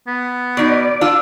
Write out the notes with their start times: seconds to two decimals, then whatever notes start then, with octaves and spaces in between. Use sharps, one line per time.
0.07 B3
0.57 B2 D#4 D5
1.01 D4 F4 E6